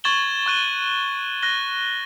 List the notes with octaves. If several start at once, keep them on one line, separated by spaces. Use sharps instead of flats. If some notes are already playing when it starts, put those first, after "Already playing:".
C#6 G#6 A6 E7 F#7 G7
C#6 F#6 D#7 G7
F#6 A#6 G7